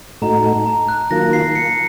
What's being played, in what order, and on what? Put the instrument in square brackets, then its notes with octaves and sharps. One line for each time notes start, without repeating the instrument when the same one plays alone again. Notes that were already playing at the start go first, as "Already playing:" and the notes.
[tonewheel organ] A2 A3 D#4 F#4 [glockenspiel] A#5
[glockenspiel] A5
A#5
F#6
[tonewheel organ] D#3 F#3 A#3 F4 [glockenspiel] A#6
[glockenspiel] C7
C#7